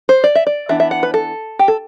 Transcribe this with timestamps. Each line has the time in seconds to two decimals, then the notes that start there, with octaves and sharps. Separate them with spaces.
0.09 C5
0.24 D5
0.35 E5
0.47 D5
0.69 E3 B3 D4 E5
0.80 E5
0.91 F#5
1.03 B4
1.14 A4
1.59 G4
1.68 A4